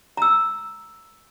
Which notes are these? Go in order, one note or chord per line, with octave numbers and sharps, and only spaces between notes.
A#5 E6